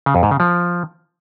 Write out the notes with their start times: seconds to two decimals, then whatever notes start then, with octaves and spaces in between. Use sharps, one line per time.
0.06 C#3
0.15 F2
0.23 G#2
0.31 C#3
0.40 F3